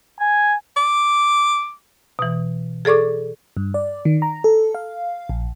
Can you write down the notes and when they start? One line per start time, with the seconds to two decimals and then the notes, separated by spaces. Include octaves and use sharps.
0.20 G#5
0.77 D6
2.19 B2 E3
2.85 G#4 A4 D5 C#6 D6
3.57 G2
3.74 D5
4.05 D#3
4.22 A#5
4.44 A4
4.75 F5
5.29 A#1